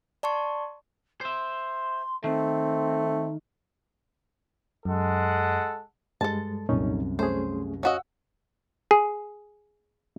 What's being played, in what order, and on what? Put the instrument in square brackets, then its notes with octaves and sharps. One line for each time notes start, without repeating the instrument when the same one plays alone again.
[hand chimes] D5 A5 C6 C#6
[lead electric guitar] C5 E5 [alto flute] C6
[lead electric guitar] D#3 [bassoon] A3 [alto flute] C4
[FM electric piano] F#2 [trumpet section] G#3 A4 F#5
[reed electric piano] G2 G3 G#3 [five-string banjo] A4 A5
[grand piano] C2 F#2 [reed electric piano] A#2 C#4 D#4
[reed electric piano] A3 C#4 G#4 [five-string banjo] C5
[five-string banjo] C#4 F#4 D#5 [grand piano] F5 F#5 E6
[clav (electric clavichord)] G#4